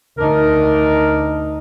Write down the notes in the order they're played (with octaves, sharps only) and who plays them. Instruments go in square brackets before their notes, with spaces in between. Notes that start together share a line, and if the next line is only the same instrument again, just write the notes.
[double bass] D2 D#4 [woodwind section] D4 A#4